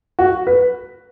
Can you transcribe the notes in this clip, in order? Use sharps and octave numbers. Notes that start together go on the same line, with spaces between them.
F#4
B4